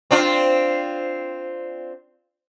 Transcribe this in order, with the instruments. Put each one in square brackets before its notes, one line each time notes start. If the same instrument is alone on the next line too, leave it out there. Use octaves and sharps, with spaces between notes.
[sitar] C4 D4 F4